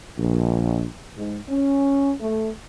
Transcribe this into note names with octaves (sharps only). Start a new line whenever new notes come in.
A#1
G#2
C#4
A3